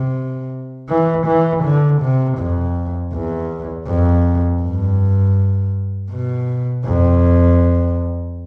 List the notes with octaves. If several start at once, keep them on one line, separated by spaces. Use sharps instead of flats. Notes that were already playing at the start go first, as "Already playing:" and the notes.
Already playing: C3
E3
E3
D3
C3
F2
E2
F2
G2
B2
F2